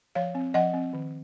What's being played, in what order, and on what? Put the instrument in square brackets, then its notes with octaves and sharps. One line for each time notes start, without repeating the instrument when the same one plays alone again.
[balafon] F3 C#5 F5
C4
F3 D#5 F#5
C4
D#3